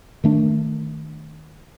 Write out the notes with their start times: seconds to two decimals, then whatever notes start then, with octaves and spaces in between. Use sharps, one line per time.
0.24 D#3 A3 D4